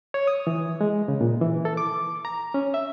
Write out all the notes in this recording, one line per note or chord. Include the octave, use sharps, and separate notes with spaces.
C#5
D#6
E3
G#3
C#3
A#2
E3
A4
D6
A#5
C#4
E5